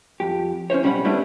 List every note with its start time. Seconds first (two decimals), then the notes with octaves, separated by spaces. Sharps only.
0.20 F2 G4
0.70 C#4 E4 C5 C#5
0.83 B1 G3 C#4 E5 F#5 B5
1.05 G3 A3 B3 D4 E4